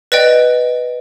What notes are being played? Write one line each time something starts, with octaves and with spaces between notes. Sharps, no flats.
B4 D5 D#5 G5